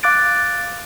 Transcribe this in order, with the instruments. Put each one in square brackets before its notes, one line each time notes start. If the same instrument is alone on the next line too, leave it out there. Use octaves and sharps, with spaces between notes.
[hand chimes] F5 D6 F#6 A6 D7